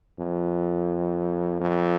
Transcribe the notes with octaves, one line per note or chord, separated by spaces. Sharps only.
F2
F2